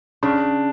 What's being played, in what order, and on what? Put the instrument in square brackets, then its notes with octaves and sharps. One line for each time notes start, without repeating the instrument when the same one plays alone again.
[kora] C#3 [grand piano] D4